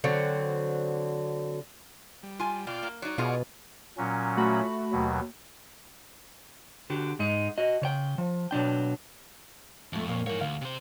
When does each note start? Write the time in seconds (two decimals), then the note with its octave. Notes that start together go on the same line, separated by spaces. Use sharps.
0.04 D3 F#3 C4
2.23 G3
2.39 F4 G#5
2.67 B2 F4 D5 G5
2.83 A#3
3.02 F#3 D#4 C#5 D5
3.18 B2 F4 G#4 F5
3.98 A#2 F#3 C#4
4.37 A3 F#4 B5
4.92 D#2 B2 F#3
6.90 D3 F#4 G4
7.19 G#2 G#3 D#4
7.58 F#4 D#5
7.82 C#3 C#5 G5
8.18 F3
8.51 B2 F#3 D4 G5
9.93 F2 F3 A3
10.07 A#2 A#3 C#5
10.27 E2 G#2 F3 A#3 C#5
10.41 D2 F5
10.62 C3 C5